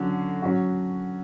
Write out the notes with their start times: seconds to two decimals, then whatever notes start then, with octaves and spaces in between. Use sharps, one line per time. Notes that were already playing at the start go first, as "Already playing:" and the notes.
Already playing: D3 F#3 C#4
0.42 F#3 C#4 F#4